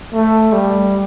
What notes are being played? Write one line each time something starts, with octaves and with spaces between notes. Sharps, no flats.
A3
G3